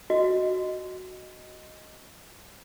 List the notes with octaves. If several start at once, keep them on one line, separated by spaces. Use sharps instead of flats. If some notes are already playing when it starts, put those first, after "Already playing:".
F#4 D#5